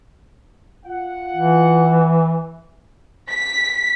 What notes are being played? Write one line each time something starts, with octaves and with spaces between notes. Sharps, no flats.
F4 F#5
E3
B6